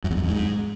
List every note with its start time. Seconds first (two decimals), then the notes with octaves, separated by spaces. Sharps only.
0.04 F#2
0.11 E2
0.17 F#2
0.23 F2
0.30 G#2